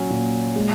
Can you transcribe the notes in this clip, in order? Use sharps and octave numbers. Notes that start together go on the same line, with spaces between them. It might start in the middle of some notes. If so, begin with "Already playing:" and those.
Already playing: A#2 F#3 C#4
A#2
G#3